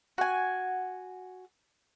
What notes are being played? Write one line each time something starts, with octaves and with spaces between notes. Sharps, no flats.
F#4 G#5